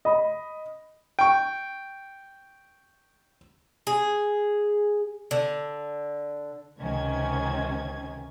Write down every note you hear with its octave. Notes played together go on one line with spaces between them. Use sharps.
D#5 B5
G5 C#6
G#4
D3
C#2 C3 D#3 C#4 G#6